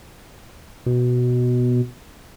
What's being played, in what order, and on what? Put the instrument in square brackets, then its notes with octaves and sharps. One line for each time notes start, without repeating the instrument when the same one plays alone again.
[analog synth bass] B2